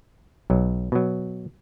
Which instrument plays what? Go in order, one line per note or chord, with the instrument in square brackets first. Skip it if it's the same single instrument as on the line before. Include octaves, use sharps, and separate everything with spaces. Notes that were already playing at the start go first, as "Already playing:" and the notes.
[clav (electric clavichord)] B1 F#3
B2 F#3